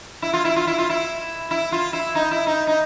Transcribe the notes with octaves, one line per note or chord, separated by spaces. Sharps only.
E4
F4
E4
F4
E4
F4
E4
E4
F4
E4
D#4
E4
D#4
D#4